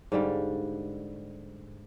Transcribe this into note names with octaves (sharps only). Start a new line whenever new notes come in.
G#2 D3 G3 F5